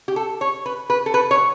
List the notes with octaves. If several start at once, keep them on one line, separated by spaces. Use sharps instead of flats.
G4
A4
C#5
B4
B4
A4
B4
C#5